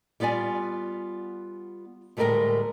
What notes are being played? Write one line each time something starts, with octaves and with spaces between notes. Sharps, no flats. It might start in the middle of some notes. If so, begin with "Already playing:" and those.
G3 B3 F4 D5 G#5
D2 A2 G3 G#3 A#4 G5